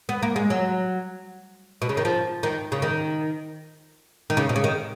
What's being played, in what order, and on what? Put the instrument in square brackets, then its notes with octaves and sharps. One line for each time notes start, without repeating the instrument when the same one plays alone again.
[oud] B3
A#3
G#3
F#3
B2
C#3
D#3
F3
D#3
C#3
D#3
D#3
C#3
B2
C#3
D#3